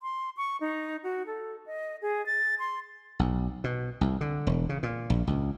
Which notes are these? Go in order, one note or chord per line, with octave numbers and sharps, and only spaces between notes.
C6
C#6
D#4
F#4
A4
D#5
G#4
A6
C6
B1
B2
C2
D3
E1
C#3
A#2
A#1
C#2